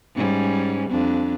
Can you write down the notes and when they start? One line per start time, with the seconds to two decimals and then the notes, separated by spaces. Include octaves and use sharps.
0.15 G#2 G3 C#4
0.90 F2 D4